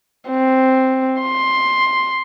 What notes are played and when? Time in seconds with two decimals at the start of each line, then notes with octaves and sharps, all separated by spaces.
0.30 C4
1.22 C6